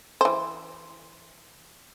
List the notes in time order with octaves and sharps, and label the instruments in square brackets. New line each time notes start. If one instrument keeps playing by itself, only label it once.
[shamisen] E3 C5